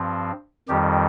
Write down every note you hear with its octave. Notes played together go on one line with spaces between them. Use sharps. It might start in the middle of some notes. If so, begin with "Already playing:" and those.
Already playing: G2 F3 C4
F2 D#3 G3 G4